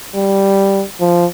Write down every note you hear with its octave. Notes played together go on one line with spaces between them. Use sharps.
G3
F3